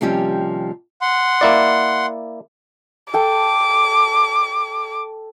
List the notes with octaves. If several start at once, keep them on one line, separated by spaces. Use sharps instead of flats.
D#2 C3 F3 G3 C#4 G4
F#5 C6
A#3 E4 D5
A4 G5 A5 D6